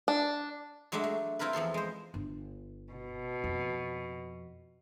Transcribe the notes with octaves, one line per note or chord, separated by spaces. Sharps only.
D4
F#3 G#3 A3 D4 E5
A3
C4 E4 F4 A#4 B4
E2 F3 A4 C6
G#3 C5
G1
B2
F2